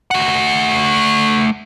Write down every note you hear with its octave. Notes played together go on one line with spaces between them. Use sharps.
A3 F#5